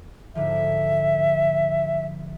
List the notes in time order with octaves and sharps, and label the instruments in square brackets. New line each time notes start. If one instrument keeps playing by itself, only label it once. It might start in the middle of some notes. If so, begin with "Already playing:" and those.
[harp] G#2 D3 F3 [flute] E5